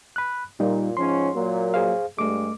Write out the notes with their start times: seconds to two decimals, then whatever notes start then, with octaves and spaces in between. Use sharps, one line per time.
0.16 B5 F#6
0.60 A#2 G3 D#4
0.97 G#2 F3 C#4 C6
1.35 A#2 F#3 A#3
1.74 G#4 C5 F5
2.19 G2 G#3 A3 D6